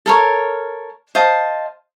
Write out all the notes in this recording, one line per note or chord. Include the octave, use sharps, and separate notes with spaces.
A4 A#4 C#5
C5 D#5 F5 A5